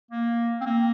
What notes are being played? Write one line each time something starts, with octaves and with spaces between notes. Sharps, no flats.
A#3
C4
A#3